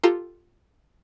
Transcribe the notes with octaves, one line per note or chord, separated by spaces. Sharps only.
F4 G4 A4 A#5 C6